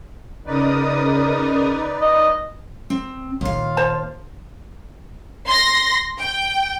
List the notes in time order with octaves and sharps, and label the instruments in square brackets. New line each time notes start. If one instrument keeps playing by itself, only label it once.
[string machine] C#3 A#4 D#6 [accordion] D#4 B4 D5
[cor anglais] D#5
[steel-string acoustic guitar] C4
[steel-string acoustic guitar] D#2 F5 [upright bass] A#2 D#3 [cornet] F4
[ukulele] C5 A5
[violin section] C6 A#6
G5